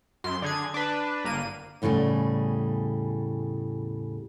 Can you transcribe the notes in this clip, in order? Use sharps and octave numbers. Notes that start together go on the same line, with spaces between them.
F#2 C6
D3 G#4 G#6
D4 B4
G1 A#3 D#7
E2 A2 C#3 G3 G#4